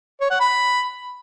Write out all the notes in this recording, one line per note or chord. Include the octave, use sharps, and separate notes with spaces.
C#5
F#5
B5